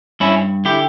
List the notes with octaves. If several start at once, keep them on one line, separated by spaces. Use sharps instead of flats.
G2 C#4 E4
D3 E4 G4